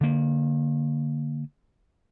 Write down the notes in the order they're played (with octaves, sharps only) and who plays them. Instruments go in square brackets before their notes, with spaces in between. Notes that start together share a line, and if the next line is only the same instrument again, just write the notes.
[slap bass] D3 A#3